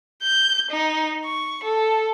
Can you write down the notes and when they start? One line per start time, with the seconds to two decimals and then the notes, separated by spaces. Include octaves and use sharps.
0.23 G6
0.71 D#4
1.25 C#6
1.64 A4